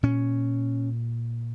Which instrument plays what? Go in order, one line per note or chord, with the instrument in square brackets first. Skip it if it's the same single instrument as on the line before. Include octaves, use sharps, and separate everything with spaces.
[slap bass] A#2 C#4